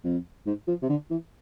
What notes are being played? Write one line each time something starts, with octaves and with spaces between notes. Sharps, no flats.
F2
G#2
F3
C3
D3
E3